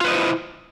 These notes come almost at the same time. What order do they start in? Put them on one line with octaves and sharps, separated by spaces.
F4 B4 D#5 C5 E4